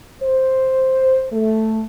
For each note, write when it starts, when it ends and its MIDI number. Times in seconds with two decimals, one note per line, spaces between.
0.22 1.26 72
1.32 1.85 57